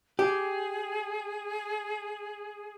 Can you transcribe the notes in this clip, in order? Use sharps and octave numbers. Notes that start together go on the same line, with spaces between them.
G4 G#4